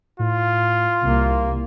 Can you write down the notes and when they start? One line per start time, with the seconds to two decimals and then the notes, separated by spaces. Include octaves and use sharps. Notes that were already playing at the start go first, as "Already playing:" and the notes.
0.19 A2 F4
1.03 C2 C3 A#3